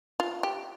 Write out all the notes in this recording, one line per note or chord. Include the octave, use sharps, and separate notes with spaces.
F4
G4